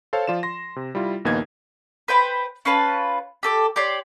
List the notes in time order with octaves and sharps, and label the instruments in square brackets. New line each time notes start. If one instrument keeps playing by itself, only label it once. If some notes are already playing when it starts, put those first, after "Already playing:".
[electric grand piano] A4 C5 C#5 F5 A5
F3 F4 D5 E7
C6 A#6
C3
G3 E4 F4
A#1 D#2 A#3 B3 D#4 G#6
[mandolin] B4 C5 G5 B5
C#4 F4 B4 A5
G4 A4 D6
G4 C#5 D5 C6